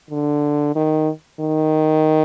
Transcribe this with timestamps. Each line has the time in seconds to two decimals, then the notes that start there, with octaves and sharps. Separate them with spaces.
0.10 D3
0.75 D#3
1.40 D#3